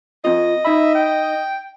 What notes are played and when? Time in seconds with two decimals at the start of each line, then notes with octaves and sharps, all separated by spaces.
0.25 C4 F4 D#5
0.65 D#4 E5 B5
0.95 G5